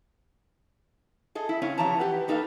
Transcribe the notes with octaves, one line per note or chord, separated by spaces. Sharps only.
G#4 A4 D#5
E4
C#3 C4 C#4
C3 E3 F3 C#5 A5 A#5
G4 B4 F#5
A#3 D#4 A4 B4 F5